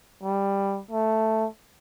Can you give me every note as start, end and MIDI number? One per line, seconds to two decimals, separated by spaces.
0.23 0.80 55
0.91 1.47 57